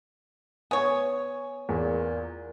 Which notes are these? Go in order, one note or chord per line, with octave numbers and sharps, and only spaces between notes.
B3 C#5 G#5
E2 A#2